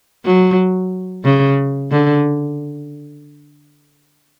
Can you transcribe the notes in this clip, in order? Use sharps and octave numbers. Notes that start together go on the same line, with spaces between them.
F#3
C#3
D3